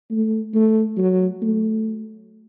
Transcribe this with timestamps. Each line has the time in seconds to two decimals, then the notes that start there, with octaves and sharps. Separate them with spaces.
0.11 A3
0.54 A3
0.97 F#3
1.42 A3